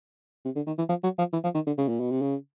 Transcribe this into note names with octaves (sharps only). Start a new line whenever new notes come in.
C3
D3
D#3
E3
F3
F#3
F3
E3
F3
D#3
D3
C#3
A#2
B2
C3
C#3